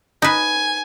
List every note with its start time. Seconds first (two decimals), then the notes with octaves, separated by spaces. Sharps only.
0.22 D#4 B4 G#5